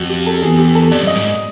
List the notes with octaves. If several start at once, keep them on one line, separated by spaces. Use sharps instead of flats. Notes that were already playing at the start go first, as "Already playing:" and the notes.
Already playing: F2 F#4
G4
A4
E2 G#4
G4
A4
F2 D5
F#2 D#5
G#2